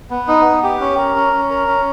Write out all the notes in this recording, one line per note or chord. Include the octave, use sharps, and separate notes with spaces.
B3
D#4
B3
G4
C#4
A#4
C#4
C#4
A#4
C#4